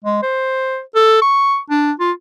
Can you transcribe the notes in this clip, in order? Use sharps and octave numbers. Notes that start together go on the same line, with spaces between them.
G#3
C5
A4
C#6
D4
F4